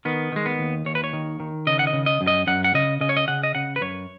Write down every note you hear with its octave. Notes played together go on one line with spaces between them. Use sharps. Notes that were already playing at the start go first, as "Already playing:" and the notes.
D#3 B3
D#3 G#3
B3
D#2
D#2 C#5
B4
C#5
D#3
D#3
C#3 D#5
F#5
D#5
C#3
D#5
F#2
D#5
F#2 F#5
F#5
C#3 D#5
C#3 D#5
C#5
D#5
C#3 F#5
D#5
C#3 F#5
B4
F#2 C#5